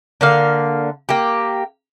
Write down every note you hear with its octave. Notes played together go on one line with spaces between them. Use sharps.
D3 A#3 F5
A#3 G4